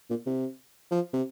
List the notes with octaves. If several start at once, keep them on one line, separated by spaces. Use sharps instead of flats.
A#2
C3
F3
C3